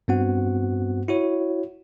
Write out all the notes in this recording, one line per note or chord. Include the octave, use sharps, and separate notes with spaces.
G2 B3 C4 F#4 F#5
E4 F#4 C#5